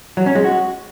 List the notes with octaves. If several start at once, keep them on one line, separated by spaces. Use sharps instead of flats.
F#3
C#4
G#3
F#4